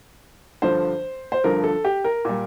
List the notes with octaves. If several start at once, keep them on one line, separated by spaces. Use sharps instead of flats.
G2 D3 F3 C5
C5
G2 D3 F3 A#4
A4
G4
A#4
A#2 G3